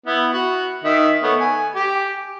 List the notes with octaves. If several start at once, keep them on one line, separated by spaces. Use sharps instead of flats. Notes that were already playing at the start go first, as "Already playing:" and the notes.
B3 E4
F#4
D#3 E5
A3 B3 C#5
G#5
G4